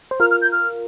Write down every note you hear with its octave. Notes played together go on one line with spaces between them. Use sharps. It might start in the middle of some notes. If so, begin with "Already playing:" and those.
C5
F4 A#4 F6
F6
G6
F6